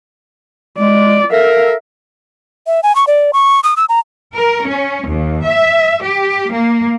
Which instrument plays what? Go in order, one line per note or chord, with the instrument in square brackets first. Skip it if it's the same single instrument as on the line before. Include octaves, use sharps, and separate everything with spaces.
[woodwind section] G#3 [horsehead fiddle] D5
[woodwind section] A4 A#4 [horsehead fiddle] E5 F5
[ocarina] E5
G#5
C#6
D5
C#6
D#6
E6
A#5
[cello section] A#4
C#4
D#2
E5
G4
A#3